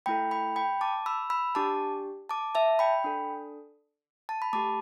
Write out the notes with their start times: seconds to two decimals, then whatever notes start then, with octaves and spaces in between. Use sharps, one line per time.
0.06 A3 E4 A4 G5 B5
0.31 G5 B5
0.56 G5 B5
0.81 A5 D6
1.06 B5 E6
1.30 B5 E6
1.55 D4 G4 A5 D6
2.29 A5 D6
2.55 E5 A5
2.79 G5 B5
3.04 D4 A4
4.29 A5
4.42 B5
4.53 A3 G4 A5 D6